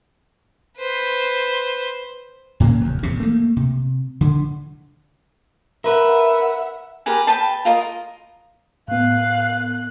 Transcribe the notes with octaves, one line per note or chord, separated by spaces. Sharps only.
B4 C5
A2 C#3 E3 A#3
F1 D#2
E2 A2 C3
A3 A#3
C3
D3
A#4 B4 E5 F#5
G4 A#4 B4 G#5
B4 G5 A5
F4 A#4 D#5
A2 B3 F5 F#6